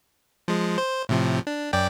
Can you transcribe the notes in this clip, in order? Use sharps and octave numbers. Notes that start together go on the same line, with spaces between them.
F3 G#3
C5
A2 C3 F3
D4
F#2 D5 G5